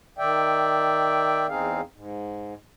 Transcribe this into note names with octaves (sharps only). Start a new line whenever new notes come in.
D#3 D5 E5 G5
E2 C4 D#4 G#4 F5
G#2